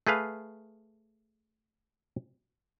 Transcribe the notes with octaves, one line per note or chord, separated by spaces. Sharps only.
A3 G#4 B4 F5